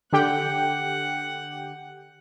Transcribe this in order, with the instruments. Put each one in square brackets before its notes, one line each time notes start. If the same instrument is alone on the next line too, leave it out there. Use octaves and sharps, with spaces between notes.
[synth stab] D3 G4 G5 [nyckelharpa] F#5